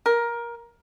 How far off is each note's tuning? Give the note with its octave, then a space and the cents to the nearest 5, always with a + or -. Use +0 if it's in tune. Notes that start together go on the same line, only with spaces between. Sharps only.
A#4 +15